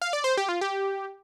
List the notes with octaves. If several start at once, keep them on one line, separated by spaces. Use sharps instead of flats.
F5
D5
C5
G4
F4
G4